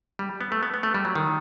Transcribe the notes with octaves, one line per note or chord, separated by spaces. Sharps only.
G3
B3
A3
B3
B3
A3
G3
F#3
D#3